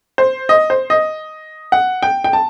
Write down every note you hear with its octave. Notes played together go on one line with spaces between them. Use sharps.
C5
D#5
C5
D#5
F#5
G5
G5
A5